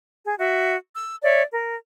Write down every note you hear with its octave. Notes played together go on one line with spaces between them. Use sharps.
G#4
F#4 E5
E6
C#5 D5 E5
A#4